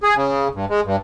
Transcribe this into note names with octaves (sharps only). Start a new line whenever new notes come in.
G#4
C#3
G2
G#3
G2